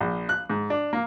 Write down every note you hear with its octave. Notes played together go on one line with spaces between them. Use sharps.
A#1
F#6
G#2
D4
A#3